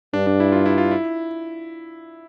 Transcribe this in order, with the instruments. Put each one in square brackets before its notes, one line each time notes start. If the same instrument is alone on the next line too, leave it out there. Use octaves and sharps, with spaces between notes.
[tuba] G2 [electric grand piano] D4
[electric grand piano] D4
E4
F4
E4
F4
E4